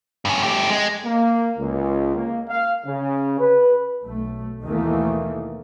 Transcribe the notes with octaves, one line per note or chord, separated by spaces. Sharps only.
G2 C#4
A3 G4
G#3
A#3
C#2
A#3
F5
C#3
B4
B1 A3
D#2 B2 D#3 E3 A3 A#3